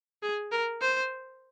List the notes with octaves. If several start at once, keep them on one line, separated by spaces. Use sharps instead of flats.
G#4
A#4
C5